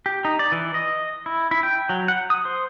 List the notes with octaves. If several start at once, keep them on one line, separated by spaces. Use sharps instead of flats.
G4
D#4
D5
E3
D#5
E4
E4
G5
F#3
F#5
D#6
C5